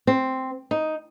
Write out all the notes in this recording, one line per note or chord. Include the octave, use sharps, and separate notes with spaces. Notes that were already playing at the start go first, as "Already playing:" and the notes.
C4
D#4